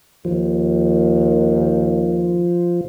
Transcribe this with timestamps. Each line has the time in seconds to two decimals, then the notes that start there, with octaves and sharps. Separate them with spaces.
0.25 D#2 F3